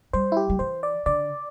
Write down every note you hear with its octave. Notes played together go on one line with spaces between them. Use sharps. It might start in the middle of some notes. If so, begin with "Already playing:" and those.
G3 C5
E4
G4
G3
E3 C5
D5
D3 D5